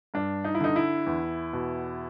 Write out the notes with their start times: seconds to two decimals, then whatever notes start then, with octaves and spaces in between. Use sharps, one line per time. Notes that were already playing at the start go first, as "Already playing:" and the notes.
0.14 G2 D4
0.44 D#4
0.55 E4
0.60 D3 D#4
0.76 E4
1.06 E2
1.53 B2